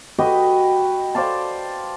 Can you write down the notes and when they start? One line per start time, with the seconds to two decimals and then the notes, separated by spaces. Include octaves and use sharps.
0.18 F#4 G4 B4 D#5
1.15 C5 D5 F5 A5